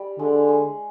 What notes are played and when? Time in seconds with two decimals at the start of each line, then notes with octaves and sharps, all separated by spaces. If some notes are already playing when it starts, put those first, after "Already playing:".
Already playing: G3
0.19 D3 G#3
0.49 G#3